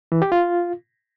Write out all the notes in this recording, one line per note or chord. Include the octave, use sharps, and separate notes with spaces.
E3
G4
F4